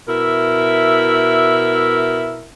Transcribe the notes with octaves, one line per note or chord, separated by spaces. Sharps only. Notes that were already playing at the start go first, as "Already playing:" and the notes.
B2 E4 A#4 E5